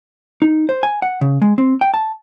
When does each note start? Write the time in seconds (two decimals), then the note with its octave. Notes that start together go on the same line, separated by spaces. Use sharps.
0.42 D#4
0.69 C5
0.83 G#5
1.02 F#5
1.21 C#3
1.42 G#3
1.58 C4
1.81 G5
1.94 A5